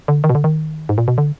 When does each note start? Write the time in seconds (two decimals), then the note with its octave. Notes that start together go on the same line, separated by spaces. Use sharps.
0.08 D3
0.24 D#3
0.30 B2
0.35 D3
0.44 D#3
0.89 G#2
0.98 A#2
1.08 B2
1.18 D3